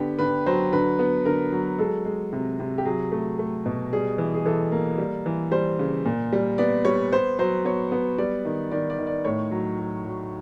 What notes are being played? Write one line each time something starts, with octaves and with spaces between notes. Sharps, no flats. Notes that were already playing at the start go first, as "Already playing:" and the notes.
Already playing: D3 B3 G4
D3 B4
F#3 C5
D3 B4
B3
D3 A#4
F#3
G#3 A4
G#3
C3
C3
G4
F#3 G#4
A3
A3
B2
G3 G#4
E3
G#4
E3 A4
A#3
G3
E3
G3 C5
C#3
A#2
G3
B3 D5
G3 C#5
B3 C5
F#3 C5
B3 C#5
B3
G3 D5
D#3
D#3 D5
D5
D#3
D5
A2 C#5
F#3
F#3
F#3